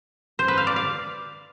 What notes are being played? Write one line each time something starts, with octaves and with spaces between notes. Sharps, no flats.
C5
B4
F5
D5
F5